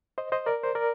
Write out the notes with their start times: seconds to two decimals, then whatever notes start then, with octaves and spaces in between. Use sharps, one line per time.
0.18 C5 D#5
0.32 C5 D#5
0.46 A#4 D5
0.64 C5
0.75 A#4 D5